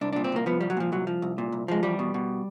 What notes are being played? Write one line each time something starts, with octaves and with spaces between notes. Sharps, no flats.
C2 D4
A#2 D4
C4
C2 A#3
F3 B3
C2 G3
F#3
A#2 F3
C2 F#3
F3
C2
A#2
C2
F3 G#3
E2 G3
B2
B2